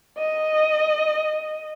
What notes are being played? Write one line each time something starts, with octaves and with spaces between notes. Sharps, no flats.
D#5